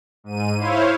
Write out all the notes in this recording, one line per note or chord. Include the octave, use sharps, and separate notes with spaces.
G#2 D#7
E4 C5 C#5 F5